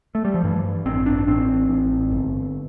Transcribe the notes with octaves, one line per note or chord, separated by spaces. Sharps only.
A3
G3
F3
G2 E3
A1 C4
D4
A1 C4
A1
G1